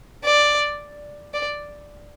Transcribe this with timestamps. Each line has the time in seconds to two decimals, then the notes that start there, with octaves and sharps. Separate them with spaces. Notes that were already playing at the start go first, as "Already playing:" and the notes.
0.24 D5
1.34 D5